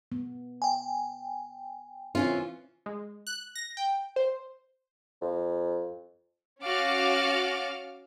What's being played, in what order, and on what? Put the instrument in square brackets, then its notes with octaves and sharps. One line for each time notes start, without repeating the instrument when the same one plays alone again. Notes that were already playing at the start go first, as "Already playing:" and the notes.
[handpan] B3
[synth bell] G5 G#5
[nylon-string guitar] E3 C#4 F4 [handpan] C4
[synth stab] G#3
F#6
A#6
G5
C5
[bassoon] F2
[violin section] C#4 F#4 F5 D6 F6 A6